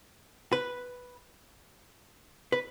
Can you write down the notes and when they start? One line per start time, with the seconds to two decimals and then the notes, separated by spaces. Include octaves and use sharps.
0.53 B4
2.52 B4